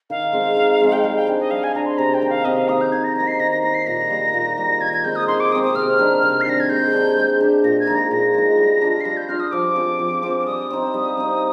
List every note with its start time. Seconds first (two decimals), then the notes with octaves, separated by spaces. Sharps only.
0.10 D#3 F5
0.33 G#3 C4
0.57 D#3
0.81 G#3 C4
0.93 G5
1.04 G3 F5
1.16 G5
1.27 D4 G#4
1.40 D#5
1.51 G3 F5
1.63 G#5
1.75 D4 G#4 A#5
1.86 C6
1.98 C3 A#5
2.14 G5
2.22 D#3 A#3
2.30 F5
2.45 C3 D#5
2.57 F5
2.69 D#3 A#3 D#6
2.81 G6
2.92 D#3 G#6
3.04 A#6
3.16 A#3 D#4 A#6
3.27 C7
3.39 D#3 A#6
3.51 A#6
3.63 A#3 D#4 A#6
3.74 C7
3.87 A#2 A#6
4.10 G3 A#3
4.34 A#2
4.57 G3 A#3
4.81 D#3 G#6
4.93 G#6
5.04 G#3 C4 G6
5.16 D#6
5.28 D#3 C6
5.40 D6
5.52 G#3 D#6
5.55 C4
5.63 D#6
5.75 C3 F6
5.99 D#3 G3 D4
6.22 C3
6.41 C7
6.46 D#3 G3 D4 A#6
6.60 G#6
6.69 G#3 G6
6.93 D4 G4
7.17 G#3
7.40 D4 G4
7.64 A#2 A#6
7.80 G#6
7.87 G#3 D#4
7.95 A#6
8.11 A#2 A#6
8.34 G#3 D#4
8.58 G3
8.81 D4 F4
9.01 C7
9.05 G3 A#6
9.17 G6
9.29 D4 F4 F6
9.40 D#6
9.52 F3 D6
9.76 C4 F4 G#4
9.99 F3
10.23 C4 F4 G#4
10.39 D6
10.46 G3 D#6
10.70 C4 D#4
10.94 G3
11.17 C4 D#4